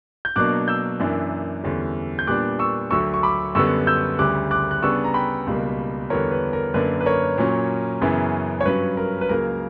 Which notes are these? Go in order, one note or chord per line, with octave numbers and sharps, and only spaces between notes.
G6
B2 F#3 A#3 D4 D6 F#6
E6 G6
F#2 E3 A#3 D4
E2 D3 G3 C#4
G6
A#2 G3 B3 D4 D6 F#6
C#6 E6
D2 D3 F#3 C#6 E6
C#6
B5 D6
F#2 D3 G3 B3 C#6 E6
E6 G6
D2 C#3 G3 D6 F#6
D6 F#6
F#6
C#3 G3 B3 D4 C#6 E6
A#5
G5 B5
C#2 B2 G3 A#3
E2 D3 G3 B3 A#4 C#5
B4
A#4
F#2 D3 A#3 D4 B4
B4
A#4 C#5
A#2 F#3 C#4
F#2 C#3 E3 B3
C#5
G2 F#3 C#4 B4
A#4
B4
C#2 C#3 F#3 A#3 A#4